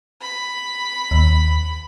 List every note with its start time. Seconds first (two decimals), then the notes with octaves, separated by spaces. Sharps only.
0.21 B5
1.11 D#2